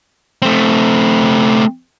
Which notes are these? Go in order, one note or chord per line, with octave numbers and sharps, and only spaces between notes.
A3 C4